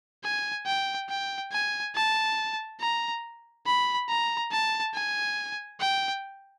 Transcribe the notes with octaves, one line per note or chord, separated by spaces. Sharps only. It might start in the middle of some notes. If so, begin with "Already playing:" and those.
G#5
G5
G5
G#5
A5
A#5
B5
A#5
A5
G#5
G5